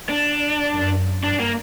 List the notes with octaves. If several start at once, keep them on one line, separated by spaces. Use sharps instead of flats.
D4
F#2
G2 D4
A#3